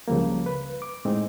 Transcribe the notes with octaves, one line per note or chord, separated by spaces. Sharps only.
C#2 C#3 F3 G3 A#3
B4
D6
A2 G#3 C4 D#4